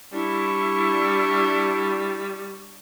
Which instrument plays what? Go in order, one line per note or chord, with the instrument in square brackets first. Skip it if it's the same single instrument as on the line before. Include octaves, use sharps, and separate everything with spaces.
[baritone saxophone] G3 [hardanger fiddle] D4 C#6 [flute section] E4